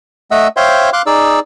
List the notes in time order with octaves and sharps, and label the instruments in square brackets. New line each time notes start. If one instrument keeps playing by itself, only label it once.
[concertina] A3 D#5 E5 F#5 E6
C5 C#5 E5 F5 G5 C6
F5 C6 D6 F#6
D#4 G#4 D5 E6